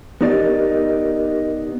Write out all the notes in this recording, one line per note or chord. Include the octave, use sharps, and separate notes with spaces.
B3 D#4 G4 A#4 D5 D#5